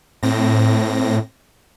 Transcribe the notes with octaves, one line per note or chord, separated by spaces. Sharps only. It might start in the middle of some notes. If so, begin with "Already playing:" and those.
A2 C4 A#6